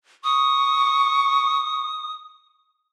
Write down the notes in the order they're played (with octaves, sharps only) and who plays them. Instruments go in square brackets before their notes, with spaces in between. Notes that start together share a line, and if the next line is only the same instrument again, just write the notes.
[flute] C#6 [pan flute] D#6